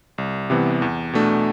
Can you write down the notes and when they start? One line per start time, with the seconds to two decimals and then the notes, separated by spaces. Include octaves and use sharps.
0.18 C2
0.50 C3 E3 B3
0.82 E2
1.13 B2 A3 D4